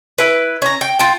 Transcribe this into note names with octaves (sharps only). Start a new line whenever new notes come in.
E4 B4
C#4 A#5
G5
F4 G5